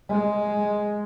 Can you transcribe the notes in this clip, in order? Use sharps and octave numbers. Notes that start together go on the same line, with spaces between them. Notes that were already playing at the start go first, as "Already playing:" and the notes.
G#3